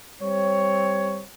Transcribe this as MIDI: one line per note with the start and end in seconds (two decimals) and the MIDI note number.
0.21 1.23 55
0.21 1.23 60
0.21 1.23 73